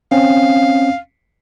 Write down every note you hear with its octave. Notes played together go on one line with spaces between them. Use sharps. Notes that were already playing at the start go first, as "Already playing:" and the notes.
C4 C#4 F5